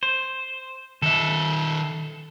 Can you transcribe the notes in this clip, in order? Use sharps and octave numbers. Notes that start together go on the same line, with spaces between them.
C5
D#3 A4 E5